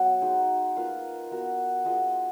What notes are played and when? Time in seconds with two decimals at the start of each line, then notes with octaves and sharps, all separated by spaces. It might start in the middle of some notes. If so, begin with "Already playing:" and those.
Already playing: F#3 B3 B4
0.21 G#3 D#4 F#4
0.76 A#3 F4 B4 F5
1.31 B3 F#4 A#4
1.85 B3 F4 G#4 D#5